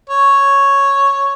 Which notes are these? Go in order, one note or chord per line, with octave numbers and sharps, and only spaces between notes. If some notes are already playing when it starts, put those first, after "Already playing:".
C#5